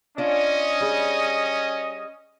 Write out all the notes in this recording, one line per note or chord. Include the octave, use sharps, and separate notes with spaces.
C#4 D4 F4 D#5
G3 G#4